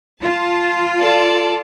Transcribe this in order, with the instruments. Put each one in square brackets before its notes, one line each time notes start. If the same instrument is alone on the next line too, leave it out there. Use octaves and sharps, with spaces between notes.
[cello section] F4 [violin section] A5
[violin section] A4 D5 A5